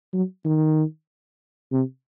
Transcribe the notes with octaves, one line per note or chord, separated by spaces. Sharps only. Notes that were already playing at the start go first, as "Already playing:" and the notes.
F#3
D#3
C3